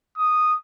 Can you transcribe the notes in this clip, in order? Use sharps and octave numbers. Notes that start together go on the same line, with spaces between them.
D#6